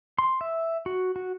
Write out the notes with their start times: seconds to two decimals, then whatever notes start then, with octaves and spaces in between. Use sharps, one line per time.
0.19 C6
0.41 E5
0.86 F#4
1.16 F#4